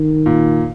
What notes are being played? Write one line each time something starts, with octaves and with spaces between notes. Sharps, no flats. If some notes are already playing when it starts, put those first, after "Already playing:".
Already playing: D#3
A#2